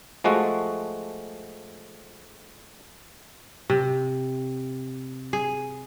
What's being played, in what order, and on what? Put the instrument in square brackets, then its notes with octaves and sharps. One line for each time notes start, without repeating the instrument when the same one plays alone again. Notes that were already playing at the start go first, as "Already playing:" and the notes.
[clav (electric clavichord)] F3 G#3 A3 F#4
[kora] C3
G#4